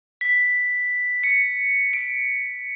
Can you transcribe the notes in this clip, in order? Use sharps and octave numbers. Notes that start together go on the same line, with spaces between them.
B6
C#7
D7